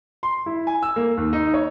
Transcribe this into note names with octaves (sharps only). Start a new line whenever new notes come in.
C6
E4
G#5
E6
A#3
D#2
D#4
C#5